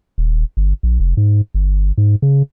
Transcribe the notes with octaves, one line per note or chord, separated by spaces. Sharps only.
D#1
G1
A#1
F1
G#2
G1
G#2
C#3